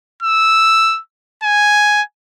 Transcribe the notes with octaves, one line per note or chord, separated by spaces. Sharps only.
E6
G#5